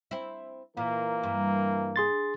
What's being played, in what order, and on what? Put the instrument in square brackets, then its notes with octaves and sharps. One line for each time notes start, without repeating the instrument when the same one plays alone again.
[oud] C4 E4
[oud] A#2 [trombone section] E3 A#3 A#4
[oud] G2
[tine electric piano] G#4 C6 A6